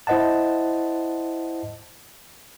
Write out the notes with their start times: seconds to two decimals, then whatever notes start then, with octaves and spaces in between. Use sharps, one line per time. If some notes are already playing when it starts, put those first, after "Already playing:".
0.07 E4 C5 D#5 F#5 A5